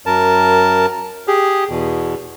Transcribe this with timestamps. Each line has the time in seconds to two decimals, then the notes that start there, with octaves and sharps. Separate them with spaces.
0.06 F#2 A#4 A5
1.28 G4 G#4
1.70 E2 B2